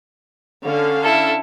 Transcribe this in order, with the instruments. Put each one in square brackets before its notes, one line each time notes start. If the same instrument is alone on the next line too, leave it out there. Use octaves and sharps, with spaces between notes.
[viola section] D3 C#4 F5
[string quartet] E4 A4